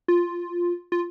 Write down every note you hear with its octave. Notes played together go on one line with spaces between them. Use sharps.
F4
F4